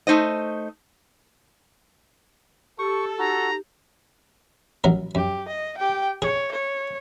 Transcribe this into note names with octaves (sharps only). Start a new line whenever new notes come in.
A3 D#4 C5 D#5
G4 A4 C#6
D#4 F#4 G4 A#5
A1 F#3 A#4
F#2 G4
D#5
G4 G5
G#4 C#5
C#5